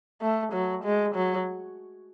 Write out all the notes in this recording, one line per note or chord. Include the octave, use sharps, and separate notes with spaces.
A3
F#3
G#3
F#3